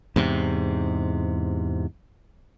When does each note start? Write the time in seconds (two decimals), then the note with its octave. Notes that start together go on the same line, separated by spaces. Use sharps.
0.16 E2 G#2 C3